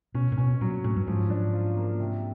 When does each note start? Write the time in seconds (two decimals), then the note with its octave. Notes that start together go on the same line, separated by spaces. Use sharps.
0.14 B2 C#4
0.32 A#2
0.38 B2 C#4
0.61 A#2 F#3
0.84 A2 C#4
0.96 G2
1.08 G#2 F3
1.30 D4
1.53 F4
1.77 A#3
2.00 C3